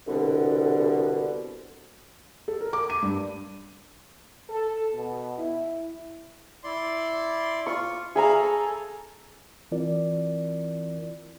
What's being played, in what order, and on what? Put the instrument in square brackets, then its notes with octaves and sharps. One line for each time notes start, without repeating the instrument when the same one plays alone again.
[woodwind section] C2 B2 D3
[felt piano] A4
A#4
D6
D#7
G2
[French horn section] A4
B2
E4
[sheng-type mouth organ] E4 D5 C6
[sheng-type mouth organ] F4 [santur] C#6
[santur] G#4 G#5 A#5 [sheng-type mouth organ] E5 F5 B5
[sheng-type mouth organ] A4
[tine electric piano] E3 C4 E4 F4 A#4 D5